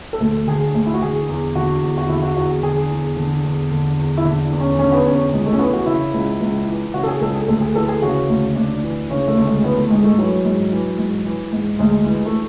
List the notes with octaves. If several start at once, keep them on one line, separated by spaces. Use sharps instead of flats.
A4
D2
D3 G#4
D2
E4
F#4
D3 G#4
E2
D3 F#4
E2
F#4
D3 E4
F#4
E2 F#4
G#4
D3 G#4
E2
D3
E2
D3
E2
E4
D3 D4
E2
C#4
D3 C#4
B3
E2 C#4
C#2 G#3
A3
C#4
E3 B3
F#4
C#3 E4
C#2
C#2
E3
C#3 F#4
A4
G#4
C#2 A4
G#4
D2 A4
G#4
E3 A4
G#4
C#3 F#4
D2
D2 D4
E3
C#3 C#4
A3
D2
G#3
E3 B3
A3
G#2 G#3
A3
E3 F#3
G#2
E3
G#2
E3
G#2
D2 G#3
E3
A3